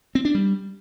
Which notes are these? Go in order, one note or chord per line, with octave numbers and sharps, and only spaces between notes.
C4
D4
G3